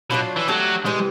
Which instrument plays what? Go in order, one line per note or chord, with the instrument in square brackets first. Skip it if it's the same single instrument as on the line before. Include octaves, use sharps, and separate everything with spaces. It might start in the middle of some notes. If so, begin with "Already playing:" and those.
[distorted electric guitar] B2 [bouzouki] F#3 A#3 D4 F4
[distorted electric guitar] E3
[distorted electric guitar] F#3 [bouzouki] A3 D4 G4
[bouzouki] C3 E3 G3 [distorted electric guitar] G#3